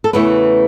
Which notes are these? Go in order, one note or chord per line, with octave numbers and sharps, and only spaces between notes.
A4
E2 C#3 E3 A3 B4